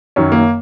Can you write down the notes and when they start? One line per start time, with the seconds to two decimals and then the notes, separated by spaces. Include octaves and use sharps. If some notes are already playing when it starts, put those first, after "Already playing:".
0.16 F#2 D#3 F#3 C#4
0.32 A#3